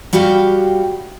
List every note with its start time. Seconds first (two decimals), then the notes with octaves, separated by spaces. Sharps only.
0.13 G3 F#4 G4 F5 G5